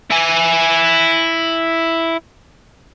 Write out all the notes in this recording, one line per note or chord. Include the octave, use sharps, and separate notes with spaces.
E4 G#5